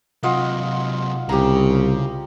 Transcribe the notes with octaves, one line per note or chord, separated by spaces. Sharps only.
C3 F#3 F4 D#5 F#5
C2 C#3 G4 A#5